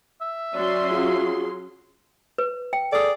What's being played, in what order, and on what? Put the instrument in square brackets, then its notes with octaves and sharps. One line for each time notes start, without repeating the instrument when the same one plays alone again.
[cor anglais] E5
[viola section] F#3 C#4 C6 [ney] D5
[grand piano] F4 F#4 [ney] G#4
[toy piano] B4
G5
[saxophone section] G#4 A4 D5